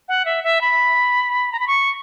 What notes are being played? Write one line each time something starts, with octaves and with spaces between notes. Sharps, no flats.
F#5
E5
E5
B5
A#5
B5
C#6